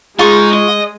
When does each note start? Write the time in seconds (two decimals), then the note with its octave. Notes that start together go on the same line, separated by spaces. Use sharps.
0.19 G#3 D#4 F4 C#6
0.53 D#5